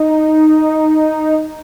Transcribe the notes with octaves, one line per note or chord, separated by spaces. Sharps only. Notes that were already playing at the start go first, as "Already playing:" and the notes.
Already playing: D#4